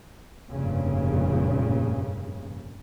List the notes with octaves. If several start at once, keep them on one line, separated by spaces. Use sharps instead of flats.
F1 G2 A#2 C#3